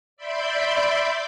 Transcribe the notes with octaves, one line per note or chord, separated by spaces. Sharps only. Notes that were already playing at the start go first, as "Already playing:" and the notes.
D5 E5 B5 C6 D6 G6